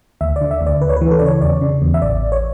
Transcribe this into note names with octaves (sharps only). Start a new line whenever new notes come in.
D2 E5
D5
D3
E5
D2
D5
D2 B4
C#5
E3 B4
A4
D5
C#3 C#5
E2 D5
C#3
E2
E5
A1 D5
A1
C#5